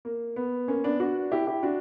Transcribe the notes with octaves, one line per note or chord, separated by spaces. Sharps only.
A#3
B3
A#3 C#4
B3 D4
D4 F#4
E4 G4
E4 G4
D4 F#4